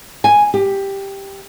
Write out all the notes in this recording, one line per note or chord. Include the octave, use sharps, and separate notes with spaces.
G#5
G4